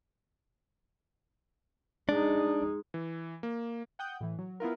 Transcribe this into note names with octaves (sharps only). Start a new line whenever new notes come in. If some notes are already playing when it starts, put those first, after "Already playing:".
G#3 D4 D#4
E3
A#3
F#5 G5 D#6 G6
A2 E3
F#3
B3 E4 F4 A#4